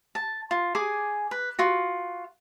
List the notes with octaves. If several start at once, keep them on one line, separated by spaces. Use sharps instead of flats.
A5
F4
G#4 G#5 D6
B4
F4 F#4